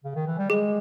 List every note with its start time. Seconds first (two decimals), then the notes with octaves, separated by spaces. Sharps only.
0.04 C#3
0.15 D#3
0.27 E3
0.38 G3
0.50 G#3 G#4